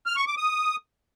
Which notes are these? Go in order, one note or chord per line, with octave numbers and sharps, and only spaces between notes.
F6
C#6
D6
D#6